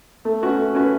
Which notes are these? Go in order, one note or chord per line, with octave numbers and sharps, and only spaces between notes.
A3
C#4 F#4 B4
A3
C#4 F#4 B4